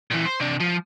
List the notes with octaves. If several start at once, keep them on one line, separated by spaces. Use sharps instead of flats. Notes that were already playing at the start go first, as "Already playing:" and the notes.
A#2 E3
C5
C3 D4
F3